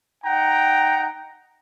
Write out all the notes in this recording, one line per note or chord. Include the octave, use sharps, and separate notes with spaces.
D#4 F#5 G5 A#5